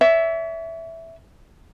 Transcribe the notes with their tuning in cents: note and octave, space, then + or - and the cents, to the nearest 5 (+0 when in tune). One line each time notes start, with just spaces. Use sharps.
C#5 +45 E5 +0